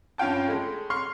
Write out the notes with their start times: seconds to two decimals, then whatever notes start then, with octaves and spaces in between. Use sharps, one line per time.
0.18 G2 C#4 F4 G5 A5
0.47 G#3 A3
0.90 C6 C#6 F6 C7